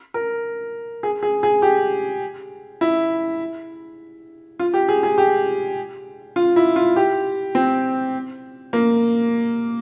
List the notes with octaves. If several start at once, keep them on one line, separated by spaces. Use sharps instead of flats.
A#4
G#4
G#4
G#4
G4
E4
F4
G4
G#4
G#4
G4
F4
E4
F4
G4
C4
A#3